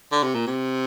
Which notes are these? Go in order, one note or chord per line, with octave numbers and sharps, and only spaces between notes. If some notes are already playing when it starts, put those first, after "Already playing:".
D3
C3
A#2
C3